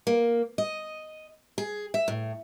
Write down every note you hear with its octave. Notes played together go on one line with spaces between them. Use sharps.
A#3
D#5
G#4
E5
A2